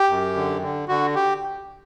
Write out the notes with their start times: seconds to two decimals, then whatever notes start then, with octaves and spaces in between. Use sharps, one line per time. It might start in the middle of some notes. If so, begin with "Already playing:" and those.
Already playing: G4
0.09 F#2
0.36 D3
0.62 D3
0.88 D3 F#4
1.15 G4